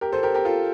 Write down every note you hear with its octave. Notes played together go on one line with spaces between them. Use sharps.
G4 A#4
A4 C5
G4 A#4
G4 A#4
F4 A4